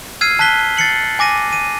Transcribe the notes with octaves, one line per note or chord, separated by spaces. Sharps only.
E6 F6 G#6 C7 D#7
A5 F#6 B6 G7
A6 C7 C#7 F#7
G#5 D6 A#6 D#7
D#7